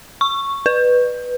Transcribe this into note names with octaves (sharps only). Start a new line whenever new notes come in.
C#6
B4